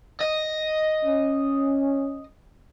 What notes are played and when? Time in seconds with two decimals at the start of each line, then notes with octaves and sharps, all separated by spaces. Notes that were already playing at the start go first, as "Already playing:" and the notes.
0.20 D#5
1.05 C#4